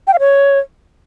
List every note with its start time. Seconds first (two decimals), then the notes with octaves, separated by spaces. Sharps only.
0.07 G5
0.13 F5
0.19 C#5